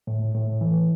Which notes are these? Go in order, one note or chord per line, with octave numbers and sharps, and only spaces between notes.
A2
A2
E3